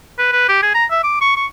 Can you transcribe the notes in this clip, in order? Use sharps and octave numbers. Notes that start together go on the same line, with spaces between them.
B4
B4
G4
G#4
A#5
E5
D6
C#6
C#6